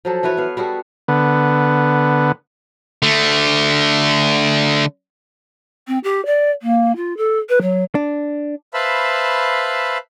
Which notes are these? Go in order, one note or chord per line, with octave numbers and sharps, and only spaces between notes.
F3 F#3 A4
E3 F#4 B4 C#5
B3 F5
G3 F#4 G#4 A4
D3 B3
D3 A3
C4
G4
D5
A#3
F4
A4
B4
F#3
D4
B4 C5 E5 F5 A5 B5